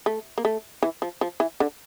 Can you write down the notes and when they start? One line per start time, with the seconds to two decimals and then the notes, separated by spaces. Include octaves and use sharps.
0.06 A3
0.38 A#3
0.45 A3
0.83 E3
1.02 F3
1.21 F3
1.40 E3
1.60 D3